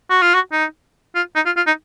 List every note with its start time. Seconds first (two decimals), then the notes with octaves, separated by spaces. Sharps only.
0.10 F#4
0.22 F4
0.34 F#4
0.52 D#4
1.15 F4
1.35 D#4
1.46 F4
1.57 F4
1.67 D#4